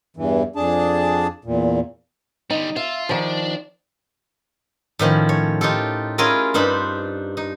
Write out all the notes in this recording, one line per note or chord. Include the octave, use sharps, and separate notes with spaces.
E2 G2 E3
F2 D4 G#4 A5
E2 A#2
D3 G3 D#4
F4 E5
D#3 F3 D4 D5
A2 D#3 F3 C#4
C#5
D#4 F4 G4 A4
C#4 E4 F4 G#4 A#4 D#5
G2 D4 D#4 C5 B5
D#4